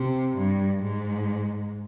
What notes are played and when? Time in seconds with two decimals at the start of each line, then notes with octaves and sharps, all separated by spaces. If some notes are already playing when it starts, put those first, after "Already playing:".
Already playing: C3
0.37 G2
0.83 G#2